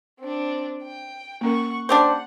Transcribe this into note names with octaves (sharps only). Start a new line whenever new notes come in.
C4 D4
G5
A#3 C#4 A#4 F#5 C#6
C#4 D4 G4 C5 F#5